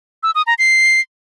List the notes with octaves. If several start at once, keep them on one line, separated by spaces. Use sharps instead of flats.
E6
D#6
A#5
C7